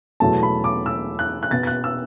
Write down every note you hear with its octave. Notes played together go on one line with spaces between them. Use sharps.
E2 B2 F#3 A3 A5
B5
D6
E6
F#6
F#6
B2 B3 A6
A6
F#6
E6